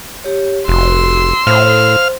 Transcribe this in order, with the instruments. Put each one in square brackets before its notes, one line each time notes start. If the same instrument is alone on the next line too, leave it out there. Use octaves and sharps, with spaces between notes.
[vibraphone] G4 C#5
[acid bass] F1 [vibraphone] F#4 [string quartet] C6 E6
[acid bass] A2 [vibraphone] C5 [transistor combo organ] F5 F6